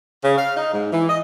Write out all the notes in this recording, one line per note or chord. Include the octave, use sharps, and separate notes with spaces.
C#3
F5
D#4
G#2
E3
D#5